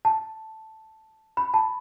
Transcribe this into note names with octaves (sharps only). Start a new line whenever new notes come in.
A5
B5
A5